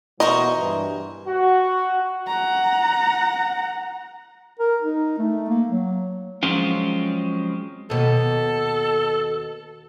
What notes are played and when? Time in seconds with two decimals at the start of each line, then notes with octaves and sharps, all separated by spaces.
0.20 B2 E3 A#4 C5 D#5 C#6
0.56 G2 E3
1.27 F#4
2.27 F#5 A#5
4.59 A#4
4.82 D#4
5.19 A3
5.49 A#3
5.68 F#3
6.43 F3 F#3 G#3 C4 C#4 F4
7.90 D#2 B2 A4